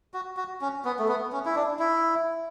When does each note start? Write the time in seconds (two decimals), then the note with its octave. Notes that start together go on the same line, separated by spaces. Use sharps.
0.14 F#4
0.37 F#4
0.61 C#4
0.85 B3
0.99 A3
1.08 B3
1.32 C#4
1.46 E4
1.55 D4
1.79 E4